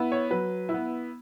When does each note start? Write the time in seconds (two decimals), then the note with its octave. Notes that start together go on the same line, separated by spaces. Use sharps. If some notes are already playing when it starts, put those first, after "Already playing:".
Already playing: B3 E4
0.12 C#5
0.30 F#3 B4
0.69 E4
0.74 B3